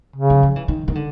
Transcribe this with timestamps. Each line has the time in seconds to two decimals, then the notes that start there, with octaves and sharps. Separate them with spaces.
0.16 C#3
0.30 F3
0.43 F3
0.56 E3
0.68 D#3
0.88 D#3
0.95 D3